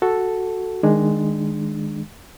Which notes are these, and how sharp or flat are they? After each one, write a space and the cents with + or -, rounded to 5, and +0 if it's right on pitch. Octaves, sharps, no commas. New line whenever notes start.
F#4 +0 A4 +0
D#3 +0 G#3 +0 D4 +20